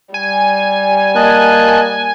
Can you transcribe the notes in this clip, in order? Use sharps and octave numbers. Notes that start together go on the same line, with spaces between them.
G3 G#5
A#3 D#5 A5 F#6